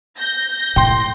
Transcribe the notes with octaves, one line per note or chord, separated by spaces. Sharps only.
G6 A#6
A2 G5 C6